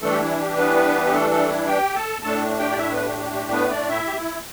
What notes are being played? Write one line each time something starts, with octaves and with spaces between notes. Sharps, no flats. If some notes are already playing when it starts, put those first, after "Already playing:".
E3 G3 A3 D4 A4
G4
E4
G4
B3 B4
G4
A3 A4
A3 A4
E4
G4 G5
A4 A5
A2 A3 D4 A4 A5
G4 G5
D5
E4 E5
B3 B4
G4
G4
G4
B3 B4
D4 D5
E4 E5
G4
E4